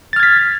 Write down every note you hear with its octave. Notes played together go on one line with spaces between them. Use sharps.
F6 G#6 A6 B6